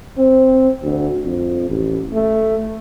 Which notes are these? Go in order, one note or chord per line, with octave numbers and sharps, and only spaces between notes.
C4
D2
F2
A1
A3